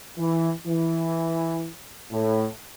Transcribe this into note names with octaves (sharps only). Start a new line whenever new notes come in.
E3
E3
A2